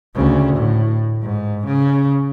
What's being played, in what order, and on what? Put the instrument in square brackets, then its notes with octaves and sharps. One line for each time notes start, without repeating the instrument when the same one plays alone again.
[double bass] D2 C#3
A2
G#2
C#3